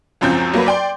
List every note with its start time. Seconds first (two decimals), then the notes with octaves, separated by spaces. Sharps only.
0.21 C#2 F#2 F3 C4 C#4 G6
0.53 F#3 A#3 F#4 B4
0.66 D5 G5 C6